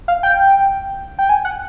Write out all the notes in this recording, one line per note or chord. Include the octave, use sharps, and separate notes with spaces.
F5
G5
G5
G#5
F#5